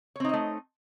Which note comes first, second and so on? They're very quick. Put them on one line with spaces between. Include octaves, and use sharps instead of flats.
C#5 C4 D#4 D#5 A3